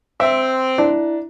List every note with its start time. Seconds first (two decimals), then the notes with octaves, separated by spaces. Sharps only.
0.20 C4 E5
0.78 D4 E4